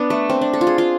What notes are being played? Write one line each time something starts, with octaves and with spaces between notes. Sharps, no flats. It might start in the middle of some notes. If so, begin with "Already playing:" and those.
Already playing: B3 D4
A3
C4
D4
A4
F4
G#4
F4